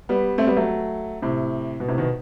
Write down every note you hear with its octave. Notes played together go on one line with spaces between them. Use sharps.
G3 B3
A3 C4
G3 B3
F#3 A3
A2 C3
B2
A2 C3
B2 D#3